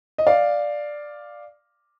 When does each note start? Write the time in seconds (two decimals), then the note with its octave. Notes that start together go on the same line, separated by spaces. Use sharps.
0.18 D#5
0.27 D5 F5